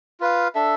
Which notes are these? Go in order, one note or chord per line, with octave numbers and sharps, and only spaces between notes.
F4 B4 F5
D4 A4 E5